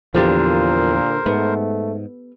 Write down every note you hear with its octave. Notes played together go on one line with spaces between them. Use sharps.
E2 A#2 D3 F3 D4 G4 A#4 C5
G#2 A3 B3